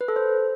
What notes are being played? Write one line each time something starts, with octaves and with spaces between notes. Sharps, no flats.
B4
A4
C5